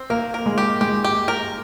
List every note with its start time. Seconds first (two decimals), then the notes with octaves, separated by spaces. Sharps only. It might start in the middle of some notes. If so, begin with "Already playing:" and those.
Already playing: C4
0.10 A#3 A#4
0.34 A#4
0.46 G#3
0.58 G4
0.81 G#3 G4
1.04 G4
1.28 A#4